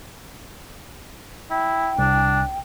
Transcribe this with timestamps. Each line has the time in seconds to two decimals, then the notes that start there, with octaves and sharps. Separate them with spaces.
1.51 E4 G5
1.99 C2 D4